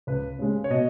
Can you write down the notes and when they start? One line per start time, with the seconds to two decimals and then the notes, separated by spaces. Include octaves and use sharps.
0.07 C#2 B4
0.39 C#3 G#3 C#4
0.64 C#5
0.70 B2 D#5